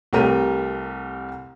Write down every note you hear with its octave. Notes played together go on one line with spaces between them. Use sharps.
C2 A3 G4 A#4 A#5 D#7